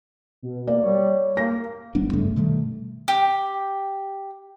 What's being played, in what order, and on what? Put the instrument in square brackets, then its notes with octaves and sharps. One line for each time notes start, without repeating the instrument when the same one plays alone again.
[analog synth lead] B2
[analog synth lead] A#3 [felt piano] D5
[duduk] G3 [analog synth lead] C#5
[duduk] A#3 [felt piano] A#6
[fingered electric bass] G1 G3 B3 D4
G2 C#3 G3 A3
B2 D#3 G3 A3
[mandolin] G4